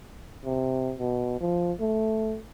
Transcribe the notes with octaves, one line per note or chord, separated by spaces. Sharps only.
C3
B2
F3
A3